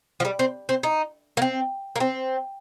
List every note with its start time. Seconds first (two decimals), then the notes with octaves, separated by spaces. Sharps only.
0.20 F3
0.25 G3
0.39 C4
0.69 C4
0.83 D#4
1.37 A#3
1.42 C4
1.96 A#3
2.00 C4